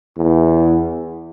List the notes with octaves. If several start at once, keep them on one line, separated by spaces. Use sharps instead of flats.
E2